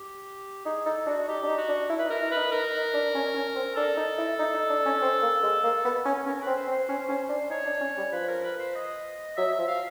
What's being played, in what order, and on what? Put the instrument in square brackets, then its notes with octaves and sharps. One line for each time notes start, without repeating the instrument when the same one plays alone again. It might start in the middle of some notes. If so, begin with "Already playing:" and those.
Already playing: [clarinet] G4
[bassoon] D#4 [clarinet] G#4
[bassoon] D#4 [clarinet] A4
[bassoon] D4 [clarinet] F#4
[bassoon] D#4 [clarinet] G4
[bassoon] D4
D#4
[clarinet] F#4
[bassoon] D4
E4
[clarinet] B4
[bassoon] D#4
[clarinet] A#4
[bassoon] E4
[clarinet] B4
[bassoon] D#4
[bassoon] D#4 [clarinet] A#4
[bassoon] D#4
D4
C#4
C#4
C4
[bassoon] D4 [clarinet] A4
[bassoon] D#4
E4
D#4
D#4
D4
C#4
C4
A#3
G#3
A#3
B3
C#4
[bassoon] C#4 [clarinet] A#4
[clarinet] B4
[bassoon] C4
[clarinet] C5
[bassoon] C4
[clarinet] C5
[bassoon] C#4
C#4
D4
[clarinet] C5
[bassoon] D#4 [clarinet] C#5
[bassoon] D4
C#4
G3
[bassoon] F3 [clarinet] B4
[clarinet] A#4
B4
C5
D#5
[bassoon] F#3 [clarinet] E5
[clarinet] E5
[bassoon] F3
[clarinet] F5